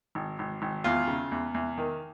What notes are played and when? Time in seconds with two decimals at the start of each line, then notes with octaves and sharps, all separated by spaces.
0.15 G#1
0.39 G#1
0.62 G#1
0.84 E2 F4
1.08 C#3
1.32 E2
1.54 E2
1.78 D#3